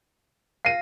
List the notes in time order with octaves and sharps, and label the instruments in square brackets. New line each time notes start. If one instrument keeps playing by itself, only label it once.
[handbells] F5 A#6 [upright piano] C7 D#7